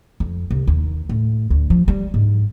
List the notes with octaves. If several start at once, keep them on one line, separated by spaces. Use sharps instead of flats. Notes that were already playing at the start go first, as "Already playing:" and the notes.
F2
C2
D#2
A2
D2
F3
G3
G#2